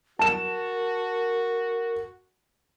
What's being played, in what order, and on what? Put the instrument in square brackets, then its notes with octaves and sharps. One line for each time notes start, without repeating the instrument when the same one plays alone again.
[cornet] F#4 [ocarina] A#4 [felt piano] A5 E7